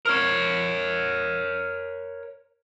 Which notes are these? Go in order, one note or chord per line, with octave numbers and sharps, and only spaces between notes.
A#4 C#5